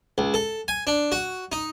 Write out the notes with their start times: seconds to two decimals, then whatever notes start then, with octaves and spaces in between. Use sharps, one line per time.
0.18 C#2
0.34 A4
0.68 G#5
0.87 D4
1.12 F#4
1.52 D#4